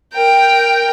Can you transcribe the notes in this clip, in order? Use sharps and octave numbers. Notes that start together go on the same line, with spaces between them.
A#4 G5